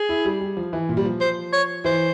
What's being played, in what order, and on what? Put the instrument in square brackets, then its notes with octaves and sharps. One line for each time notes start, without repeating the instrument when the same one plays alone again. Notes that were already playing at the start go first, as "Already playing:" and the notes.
Already playing: [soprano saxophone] G#4
[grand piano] E4
G3
G3
F3
E3
A#2
G3
F3
[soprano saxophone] C5
C#5
[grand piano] E3 [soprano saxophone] C5